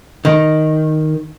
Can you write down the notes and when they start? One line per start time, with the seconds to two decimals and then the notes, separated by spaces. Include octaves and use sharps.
0.25 D#3